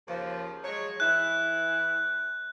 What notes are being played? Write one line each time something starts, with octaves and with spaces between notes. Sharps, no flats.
D#2 C#3 F3
F#3 G#3 C#5
E3 E4 F#6